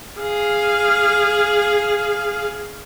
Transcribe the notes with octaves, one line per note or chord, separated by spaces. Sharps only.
G#4 F5